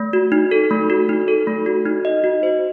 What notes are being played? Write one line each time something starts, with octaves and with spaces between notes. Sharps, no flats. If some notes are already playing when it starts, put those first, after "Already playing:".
Already playing: A3
F#4
D#4
A4
A3
F#4
D#4
A4
A3
F#4
D#4
D#5
F#4
C5